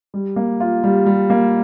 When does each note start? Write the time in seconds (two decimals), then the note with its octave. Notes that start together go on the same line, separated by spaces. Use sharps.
0.14 G3
0.36 A#3
0.60 F4
0.84 G3
1.06 G3
1.30 A#3